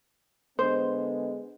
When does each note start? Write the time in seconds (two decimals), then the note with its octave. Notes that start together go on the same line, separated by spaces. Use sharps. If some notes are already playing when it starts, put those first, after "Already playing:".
0.59 D3 G#3 B3 C5